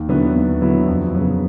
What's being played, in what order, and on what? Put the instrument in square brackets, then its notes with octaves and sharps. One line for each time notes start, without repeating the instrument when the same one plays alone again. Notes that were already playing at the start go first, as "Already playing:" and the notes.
Already playing: [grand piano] D#2
D3 F#3 B3 E4
D#2
D3 F#3 B3 E4
F2
C#3 F#3 B3